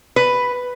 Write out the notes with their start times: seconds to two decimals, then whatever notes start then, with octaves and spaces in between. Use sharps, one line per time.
0.16 B4